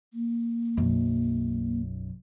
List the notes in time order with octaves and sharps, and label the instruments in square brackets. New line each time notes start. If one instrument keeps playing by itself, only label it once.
[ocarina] A#3
[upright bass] B1 F#2